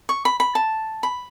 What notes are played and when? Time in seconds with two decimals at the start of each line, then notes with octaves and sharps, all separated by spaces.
0.09 C#6
0.25 B5
0.40 B5
0.55 A5
1.03 B5